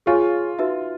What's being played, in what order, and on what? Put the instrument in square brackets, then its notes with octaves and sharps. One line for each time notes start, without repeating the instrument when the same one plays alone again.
[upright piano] F4 [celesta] G#4 C#5 F5 G#5 C#6
[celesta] D#4 F#4 B4 E5